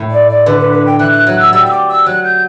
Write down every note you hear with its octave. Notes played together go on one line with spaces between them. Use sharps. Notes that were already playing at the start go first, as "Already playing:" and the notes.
Already playing: A2
D5
D5
D3 B4
B4
B4
G5
E3 F#6
F#6
F#3 F#6
E6
G3 E6
E6
D6
E6
F#3 F#6
G6